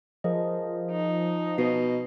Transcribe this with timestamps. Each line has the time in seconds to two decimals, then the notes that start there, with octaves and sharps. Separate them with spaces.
0.24 F3 G#4 A#4 D#5
0.91 D#4
1.58 B2 C7